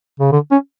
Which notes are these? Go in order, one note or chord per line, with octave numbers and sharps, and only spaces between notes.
C#3
D3
C#4